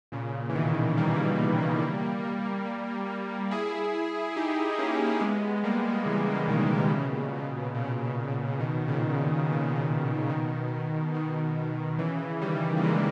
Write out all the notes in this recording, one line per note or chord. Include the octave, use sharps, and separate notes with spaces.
A#2 C#3
E3
B2 D#3
G3 A#3
E4 G#4
D#4 G4
A#3 C#4
G#3 B3
G3 A#3
C#3 E3
B2 D#3
C#3
B2
A#2 C#3
C#3
B2
A#2 C#3
B2 D#3
A#2 C#3
B2
D#3
C#3
B2
A#2 C#3
B2 D#3
B2 D#3
C#3 E3
D#3 G3
A#3
E3 G#3